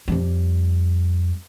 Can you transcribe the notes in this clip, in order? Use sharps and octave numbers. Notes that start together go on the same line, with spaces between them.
F2 G3